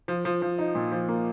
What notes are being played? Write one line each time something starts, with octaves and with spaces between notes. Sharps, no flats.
F3
F3
F3
D#4
A#2
F3
A#3